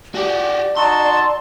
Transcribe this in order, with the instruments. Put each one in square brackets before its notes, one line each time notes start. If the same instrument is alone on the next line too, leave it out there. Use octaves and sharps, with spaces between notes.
[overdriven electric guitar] F#4 G4 [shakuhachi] D5
[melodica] D#4 F#4 E6 [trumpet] A5 [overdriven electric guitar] C6